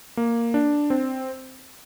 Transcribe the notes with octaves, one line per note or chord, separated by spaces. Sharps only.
A#3
D4
C4